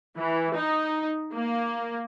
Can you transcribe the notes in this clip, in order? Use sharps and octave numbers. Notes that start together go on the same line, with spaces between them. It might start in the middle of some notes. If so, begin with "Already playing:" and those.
E3
D#4
A#3